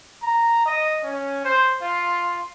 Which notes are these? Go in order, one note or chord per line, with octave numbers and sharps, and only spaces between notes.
A#5
D#5
C#4
C5
F4